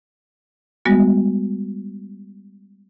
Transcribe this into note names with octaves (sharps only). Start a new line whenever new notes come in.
G3 G#3 B3 F#4